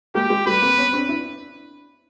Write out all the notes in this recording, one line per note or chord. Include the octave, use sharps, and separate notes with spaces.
G#3 A#3 G4
G#3
G3 A3 B4
A#3 C4
B3 C#4
C4 D4
D4 E4